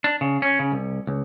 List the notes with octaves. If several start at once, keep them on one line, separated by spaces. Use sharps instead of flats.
D4
C#3
C#4
C#3
C2
C#2